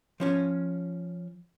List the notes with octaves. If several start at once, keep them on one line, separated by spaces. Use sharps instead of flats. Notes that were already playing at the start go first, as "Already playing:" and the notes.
F3 C#4 C#5